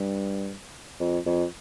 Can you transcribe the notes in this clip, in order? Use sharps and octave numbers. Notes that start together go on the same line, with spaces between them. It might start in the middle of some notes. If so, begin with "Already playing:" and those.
Already playing: G2
F2
F2